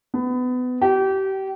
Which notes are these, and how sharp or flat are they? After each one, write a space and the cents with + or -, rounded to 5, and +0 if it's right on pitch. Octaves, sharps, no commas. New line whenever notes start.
B3 +25
G4 -30